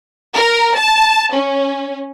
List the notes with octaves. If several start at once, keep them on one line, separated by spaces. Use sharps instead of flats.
A#4
A5
C#4